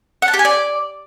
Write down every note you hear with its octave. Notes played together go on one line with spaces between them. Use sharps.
F#5
A5
G4
G#5
D5